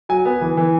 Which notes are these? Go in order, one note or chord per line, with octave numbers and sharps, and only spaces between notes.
F#3 G#5
B3
E3
E3